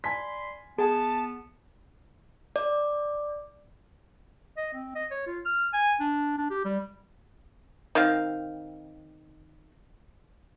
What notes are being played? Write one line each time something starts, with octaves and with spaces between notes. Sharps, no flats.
D5 G#5 B5 C6 B6
B3 G#4 A5
D5
D#5
C4
D#5
C#5
F4
F6
G#5
D4
D4
G4
G3
D#3 C4 F5